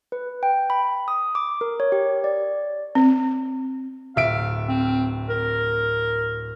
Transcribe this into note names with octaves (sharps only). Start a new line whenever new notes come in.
B4
G5
B5
D#6
D6
A#4
C#5
G4
D5
C4
D1 E5 F5 D7
C4
A#4